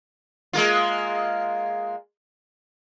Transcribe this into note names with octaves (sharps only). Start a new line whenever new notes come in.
G#3 A#3 F4